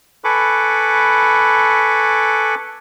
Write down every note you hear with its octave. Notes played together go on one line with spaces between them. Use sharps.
A4 B4 G#5 B5 C#6 D6